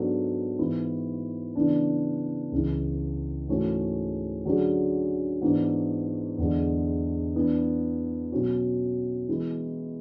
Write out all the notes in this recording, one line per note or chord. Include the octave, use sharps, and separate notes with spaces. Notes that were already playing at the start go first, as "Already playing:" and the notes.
Already playing: G#2 F#3 B3 D4 A4
G#2 E3 B3 E4
C#3 E3 B3 D4
C#2 C#3 E3
G#2 E3 A3 C#4 F#4
D3 F#3 C#4 G#4
G#2 E3 B3 D4
E2 D3 G#3
E3 B3 D4
B2 F#3 C#4 F#4
E3 G#3 B3 E4